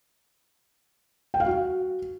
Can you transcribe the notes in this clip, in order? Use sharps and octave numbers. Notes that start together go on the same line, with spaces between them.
G5
F5
F#4